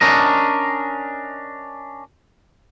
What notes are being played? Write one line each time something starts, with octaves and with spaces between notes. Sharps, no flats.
C#4 D4 A#4 D#5